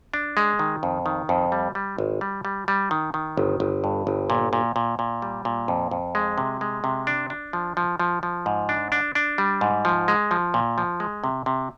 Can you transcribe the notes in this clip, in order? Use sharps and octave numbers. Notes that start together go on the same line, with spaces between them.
D4
G#3
D#3
F2
D#3
F2
G3
G3
G#1
G3
G3
G3
D#3
D#3
G1
G1
G2
G1
A#2
A#2
A#2
A#2
G3
A#2
F2
F2
G#3
C3
G#3
C3
D4
D4
F3
F3
F3
F3
G#2
D4
D4
D4
G3
G#2
F3
G#3
F3
A#2
F3
G#3
C3
C3